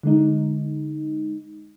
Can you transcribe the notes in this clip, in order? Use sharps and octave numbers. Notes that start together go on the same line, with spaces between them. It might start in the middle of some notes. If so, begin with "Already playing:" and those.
D3 G#3 D#4